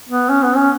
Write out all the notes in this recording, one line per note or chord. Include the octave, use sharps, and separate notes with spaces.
B3
C#4
B3
C#4